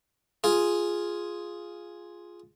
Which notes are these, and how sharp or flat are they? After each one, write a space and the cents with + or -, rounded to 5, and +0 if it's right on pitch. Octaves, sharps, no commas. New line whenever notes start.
F4 +0 G#4 +0